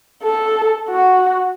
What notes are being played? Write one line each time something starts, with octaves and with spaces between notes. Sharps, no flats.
A4
F#4